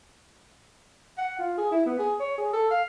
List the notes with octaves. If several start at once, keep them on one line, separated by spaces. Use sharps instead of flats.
F#5
F4
G#4
E4
B3
G#4
C#5
G#4
A4
F5